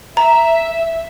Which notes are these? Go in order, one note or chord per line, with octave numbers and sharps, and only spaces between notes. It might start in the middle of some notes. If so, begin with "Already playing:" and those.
E5 A#5